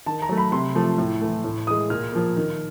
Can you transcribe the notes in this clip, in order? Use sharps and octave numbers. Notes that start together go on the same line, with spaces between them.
D#3 A5
A#5
F#3 A3
B5
C3 C6
F3 A3
A2
E3 A3
A2
E3 G#3 D#6
A#2 F6
F3 A#3
D#3